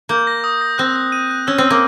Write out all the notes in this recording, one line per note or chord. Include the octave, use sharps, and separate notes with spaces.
A#3 G6
A#6
D#6
A#6
C4 F#6
F#6
D#7
F#6
C#4 E6
C4
E6
A#3